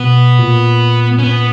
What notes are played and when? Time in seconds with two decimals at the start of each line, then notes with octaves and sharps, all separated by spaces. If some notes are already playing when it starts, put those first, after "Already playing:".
Already playing: B2 B3
0.39 A#2
1.18 C#4
1.24 B3